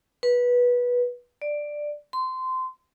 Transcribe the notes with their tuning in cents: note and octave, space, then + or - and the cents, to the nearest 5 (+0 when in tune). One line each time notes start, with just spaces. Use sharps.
B4 -15
D5 +10
C6 -20